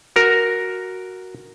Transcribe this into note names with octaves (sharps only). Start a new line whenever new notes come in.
F#4 A#4